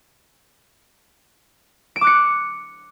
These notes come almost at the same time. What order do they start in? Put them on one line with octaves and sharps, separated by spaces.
D7 E7 D6 F#6 C#7